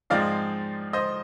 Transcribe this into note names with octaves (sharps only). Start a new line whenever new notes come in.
G#2 F3 G#3 C4 D#4 D5 F5
C5 D#5